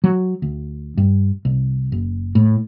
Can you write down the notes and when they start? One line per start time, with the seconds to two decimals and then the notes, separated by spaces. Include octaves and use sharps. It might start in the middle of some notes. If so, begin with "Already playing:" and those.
0.04 F#3
0.42 D2
0.97 G2
1.45 C2
1.92 F#1
2.35 A2